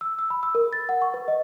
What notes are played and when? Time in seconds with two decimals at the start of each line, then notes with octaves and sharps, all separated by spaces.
0.01 E6
0.19 E6
0.30 B5
0.43 E6
0.55 A#4
0.73 A6
0.89 F#5
1.02 C#6
1.14 B4
1.28 D#5